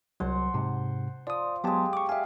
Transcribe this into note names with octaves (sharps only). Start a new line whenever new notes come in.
C2 F#3 C5 F#5 A5
G#2 C3
F3 D5 D#6
F#3 G#3 B3 G4 A5
C#6 D6
D5 E5 F5 G#5